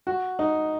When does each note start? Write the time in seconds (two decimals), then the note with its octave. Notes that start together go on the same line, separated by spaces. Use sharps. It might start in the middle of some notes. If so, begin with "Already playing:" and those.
0.07 F#4
0.39 D#4